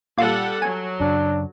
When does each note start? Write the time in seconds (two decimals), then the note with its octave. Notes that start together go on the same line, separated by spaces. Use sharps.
0.18 A#2 G3 F4 A4 F#5
0.62 F#3 G#5
1.00 F#2 C#3 D4